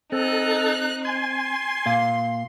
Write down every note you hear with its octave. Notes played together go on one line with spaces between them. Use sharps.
C4 D#4 A4 F#6
G#5 C6
A#2 F5